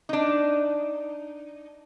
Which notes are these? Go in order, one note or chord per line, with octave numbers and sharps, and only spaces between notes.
D4 D#4